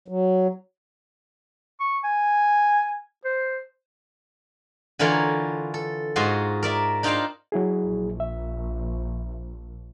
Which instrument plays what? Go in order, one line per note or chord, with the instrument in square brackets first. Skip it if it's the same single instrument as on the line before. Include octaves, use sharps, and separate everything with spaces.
[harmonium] F#3
[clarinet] C#6
G#5
C5
[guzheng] D3 E3 E4 F4 A#4 C#5
A4
G#2 F4 F#4 D#5 C6
A#4 D5 E5
D4 D#4 F4 C5 F5 G5
[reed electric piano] F#3 E4 G#4
[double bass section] A#1
[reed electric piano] E5